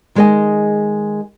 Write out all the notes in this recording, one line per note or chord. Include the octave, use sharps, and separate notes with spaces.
D#3 G#3 G#4 C#5 D#5 G#5